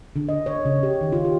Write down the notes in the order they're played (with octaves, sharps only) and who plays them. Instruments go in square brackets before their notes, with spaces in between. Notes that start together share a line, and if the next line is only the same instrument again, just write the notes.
[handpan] D3
D#5
C#5
C#3
G4
D#3
F4
G4